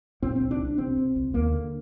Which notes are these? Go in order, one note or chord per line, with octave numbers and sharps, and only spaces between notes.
A#2 C4
C2 C4
D4
C2
D4
C3 C4
C3
C2
D#2 A#3
D3